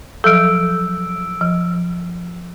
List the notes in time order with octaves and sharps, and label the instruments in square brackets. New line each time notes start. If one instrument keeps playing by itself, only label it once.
[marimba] F3 F#3 A4 [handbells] E6 D7
[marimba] F3